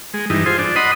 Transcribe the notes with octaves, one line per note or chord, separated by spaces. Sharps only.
G#3
G2 E3 D#4
F4 G#4 C5
D4
D#5 F#5 B5 C6 D#6